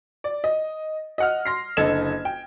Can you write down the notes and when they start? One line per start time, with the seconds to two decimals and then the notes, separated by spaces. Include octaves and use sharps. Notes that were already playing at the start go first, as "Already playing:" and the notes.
0.24 D5
0.44 D#5
1.18 D#5 F#5 F6
1.45 C6 A#6 C7
1.77 F#1 D3 A4 D#5 G#6 E7
2.25 G5